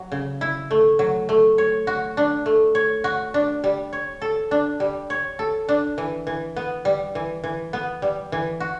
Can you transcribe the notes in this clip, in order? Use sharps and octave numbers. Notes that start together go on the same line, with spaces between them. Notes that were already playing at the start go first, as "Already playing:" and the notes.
Already playing: F#3
C#3
E4
A3
F#3
A3
C#5
F#4
D4
A3
C#5
F#4
D4
G3
C#5
A4
D4
G3
C#5
A4
D4
E3
E3
B3
G3
E3
E3
B3
G3
E3
F#4